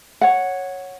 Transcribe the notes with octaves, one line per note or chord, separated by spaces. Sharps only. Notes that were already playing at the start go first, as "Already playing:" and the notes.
C#5 F#5